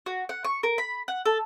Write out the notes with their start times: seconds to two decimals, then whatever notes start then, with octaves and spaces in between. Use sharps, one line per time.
0.06 F#4
0.29 F#5
0.44 C#6
0.63 A#4
0.78 B5
1.08 F#5
1.26 A4